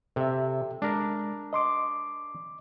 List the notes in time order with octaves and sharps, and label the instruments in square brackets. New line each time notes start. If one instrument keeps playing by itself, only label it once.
[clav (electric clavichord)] C3 [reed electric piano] A4 E5
[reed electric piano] G#3 [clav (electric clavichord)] D4 A#4
[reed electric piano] D#5 C6 D6